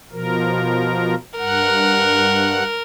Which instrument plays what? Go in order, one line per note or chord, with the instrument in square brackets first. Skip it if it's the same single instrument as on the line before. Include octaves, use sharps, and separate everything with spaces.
[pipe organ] B2 F3 A#4
[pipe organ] G2 F#5 [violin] A#4